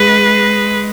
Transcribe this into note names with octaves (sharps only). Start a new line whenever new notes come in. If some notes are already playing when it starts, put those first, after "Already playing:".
Already playing: G#3 B4